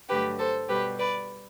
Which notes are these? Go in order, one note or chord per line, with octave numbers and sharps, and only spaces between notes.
G2 D3 F#3 A3 G4 B4
A4 C5
B2 G3 G4 B4
B4 D5